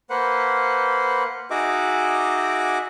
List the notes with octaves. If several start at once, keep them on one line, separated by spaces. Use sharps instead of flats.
A#3 B4 C5 F#5
D#4 F#4 G#4 D#5 E5 D6